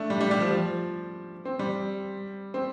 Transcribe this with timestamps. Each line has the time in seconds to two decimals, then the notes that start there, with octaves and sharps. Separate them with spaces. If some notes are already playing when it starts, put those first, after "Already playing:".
Already playing: A3 D4
0.10 G3
0.21 G3
0.31 G3
0.40 F3
0.51 F3
1.45 C4
1.59 G3
2.54 C4